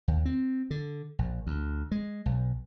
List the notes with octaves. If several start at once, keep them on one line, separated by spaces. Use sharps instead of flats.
D#2
C4
D3
A#1
D2
G#3
B1